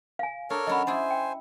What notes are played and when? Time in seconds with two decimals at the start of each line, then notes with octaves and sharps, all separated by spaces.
0.19 F5 G#5
0.50 D4 A4 A#4 C#5
0.67 F#3 C#4 D#5 B5
0.87 E4 G#4 C5 D5 G#5
1.11 G5